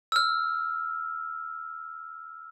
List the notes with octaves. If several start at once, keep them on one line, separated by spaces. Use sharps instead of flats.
E6 F6